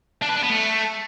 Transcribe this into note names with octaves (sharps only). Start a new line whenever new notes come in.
D4
B4
D4
B3
A3